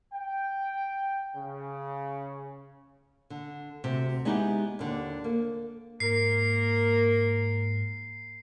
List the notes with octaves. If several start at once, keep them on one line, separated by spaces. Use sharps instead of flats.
G5
C#3
D3
D2 C3
G#3 B3 D#4 E4 F#4 G4
D#2 D3
A#3
G#2 A#3 A#4 C7